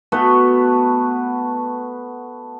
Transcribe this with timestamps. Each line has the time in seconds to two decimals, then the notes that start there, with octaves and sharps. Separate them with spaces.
0.12 A3 B3 F#4 B4